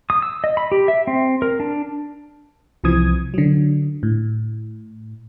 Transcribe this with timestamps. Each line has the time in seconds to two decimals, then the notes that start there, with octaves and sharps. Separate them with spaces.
0.10 D#6
0.22 E6
0.44 D#5
0.57 B5
0.72 G4
0.88 E5
1.07 C4
1.42 A#4
1.60 D4
2.84 C2 C3 E3 F3 D#6 G#6
3.34 D3 F#3
4.03 A2